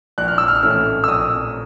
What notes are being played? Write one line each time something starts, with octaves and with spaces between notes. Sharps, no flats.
A#1 F#6
F6
E6
F6
A2 E3 A3 C#4 F6
E6
A#1 D#6